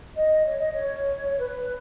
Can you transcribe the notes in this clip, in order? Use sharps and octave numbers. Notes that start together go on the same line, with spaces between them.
D#5
C#5
D#5
C#5
B4